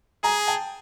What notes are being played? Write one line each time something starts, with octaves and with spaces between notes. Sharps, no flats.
G#4 G#5 A#5
G5 A5